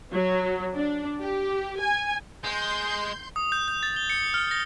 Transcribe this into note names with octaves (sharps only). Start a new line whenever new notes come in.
F#3
D4
G4
G#5
G#3 C6 G6
D#6
G6
G6
A6
G7
C#7
F6
A#6